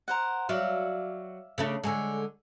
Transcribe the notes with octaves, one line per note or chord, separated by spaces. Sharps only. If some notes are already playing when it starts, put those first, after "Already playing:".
A#4 C5 F#5
F#3 D5 E5 F5
C#3 A3 D4
D3 G#3 C#5 G#5